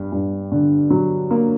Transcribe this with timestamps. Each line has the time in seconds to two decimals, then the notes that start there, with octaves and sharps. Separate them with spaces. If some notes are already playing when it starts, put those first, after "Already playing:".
Already playing: G2
0.12 G2
0.52 D3
0.90 F#3
1.30 A#3